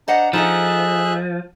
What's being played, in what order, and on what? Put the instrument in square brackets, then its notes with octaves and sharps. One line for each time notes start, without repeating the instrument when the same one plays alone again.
[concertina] D4 A#5 [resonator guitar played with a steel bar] C5 D#5 F#5
[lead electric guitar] F3 [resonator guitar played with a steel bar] D#4 A4 D#5 [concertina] G#4 E5 F#6